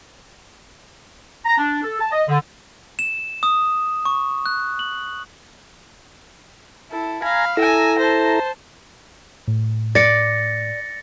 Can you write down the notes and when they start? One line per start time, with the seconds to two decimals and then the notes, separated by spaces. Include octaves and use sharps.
1.45 A#5
1.58 D4
1.83 A4
2.00 A5
2.11 D#5
2.28 D3
2.99 E7
3.43 D#6
4.06 C#6
4.46 F#6
4.79 F#7
6.91 E4 A4
7.22 F5 G#5 A#5 B5
7.57 E4 A4 G#5 A#5 E6
7.99 C5 A5
9.48 A2
9.95 D5 A6 A#6 C#7